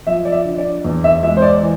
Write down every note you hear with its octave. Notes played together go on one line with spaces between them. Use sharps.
F3 E5
D5
E5
D3
D5
E2
E5
G#3 E5
C5
D5
E3